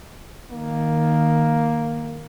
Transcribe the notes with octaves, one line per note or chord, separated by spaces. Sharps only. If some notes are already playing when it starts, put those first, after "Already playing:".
D#3 A#3